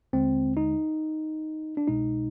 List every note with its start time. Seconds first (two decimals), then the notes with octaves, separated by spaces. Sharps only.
0.13 D#2 D3 G#3 C4
0.57 D#4
1.77 D4
1.87 C2 B2 G#3 D#4